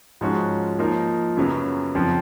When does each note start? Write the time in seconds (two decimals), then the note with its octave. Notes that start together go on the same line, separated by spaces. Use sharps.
0.21 G#2 F3 G#3 C#4 F#4
0.79 F3 A#3 D#4 A#4
1.37 F#2 C#3 F#3 B3
1.95 F2 C#3 F3